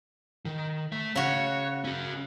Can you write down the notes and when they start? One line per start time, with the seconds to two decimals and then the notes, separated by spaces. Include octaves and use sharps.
0.45 D#3
0.92 A3 E5
1.16 C#3 F#4 C#5
1.84 C#4 F#4